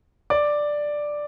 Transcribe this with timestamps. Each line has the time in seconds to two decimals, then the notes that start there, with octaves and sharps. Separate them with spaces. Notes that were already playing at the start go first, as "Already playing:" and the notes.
0.30 D5